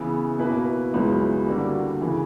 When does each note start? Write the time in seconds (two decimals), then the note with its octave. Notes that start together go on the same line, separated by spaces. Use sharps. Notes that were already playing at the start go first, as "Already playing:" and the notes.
Already playing: C#3 E3 B3
0.38 B2 A#3 E4 B4
0.93 C#2 C#3 F#3 B3 E4
1.47 D3 G3 A#3 D4 F#4
2.01 C#3 E3